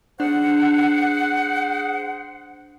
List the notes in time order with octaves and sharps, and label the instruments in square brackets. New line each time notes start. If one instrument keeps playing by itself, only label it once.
[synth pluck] D4 [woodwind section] G#4 C5 F#5